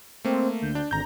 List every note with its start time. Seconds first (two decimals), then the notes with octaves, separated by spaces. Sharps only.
0.25 A3 A#3 C4
0.62 D2 G6
0.75 D4
0.91 G#1 D3 A#5 G6 A#6